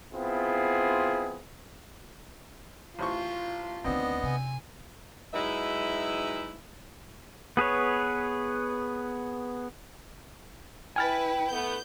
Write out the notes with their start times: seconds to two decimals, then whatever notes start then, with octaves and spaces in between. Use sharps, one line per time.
0.12 B3 C4 E4 F4 G#4
2.99 A1 F4 C5 C#6
3.84 D2 D#3 B3 C4 D4 D#5
4.23 C3 G#5
5.34 F#3 G#3 D#4 E4 B4 E5
7.57 B3 G#4 B4 C#5
10.96 E4 B4 G5 G#5 F6 A6
11.51 A3 B3 G6